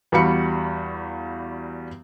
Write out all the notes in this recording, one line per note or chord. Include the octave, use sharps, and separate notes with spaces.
E2 G3 F#4 F5 B5 C#7